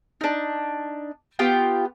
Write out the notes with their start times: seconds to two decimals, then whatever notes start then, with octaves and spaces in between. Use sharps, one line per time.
0.21 D4 D#4
1.39 B3 F4 G4 G5